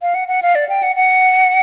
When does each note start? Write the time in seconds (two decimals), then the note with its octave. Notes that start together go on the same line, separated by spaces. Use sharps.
0.02 F5
0.15 F#5
0.28 F#5
0.42 F5
0.55 D5
0.69 G5
0.83 F#5
0.96 F#5